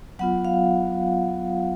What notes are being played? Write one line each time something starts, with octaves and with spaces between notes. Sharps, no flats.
F#3 B3 F4 F#5
F5